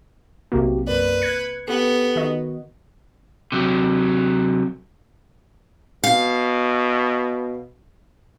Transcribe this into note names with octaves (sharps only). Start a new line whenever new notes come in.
B1 C3 A#3 F#4 G4
F#2 A#4 B4 D5
F#6 G#6 C#7
B3 G4 A4
D#3 F#4 D#5
C3 F#3
B2 F5